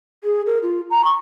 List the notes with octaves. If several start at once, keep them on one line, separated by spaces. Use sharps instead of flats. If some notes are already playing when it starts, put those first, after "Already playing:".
G#4
A#4
F4
A#5
C#6